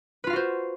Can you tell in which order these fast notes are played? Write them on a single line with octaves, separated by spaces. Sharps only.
B4 F4 F5 F#4 C5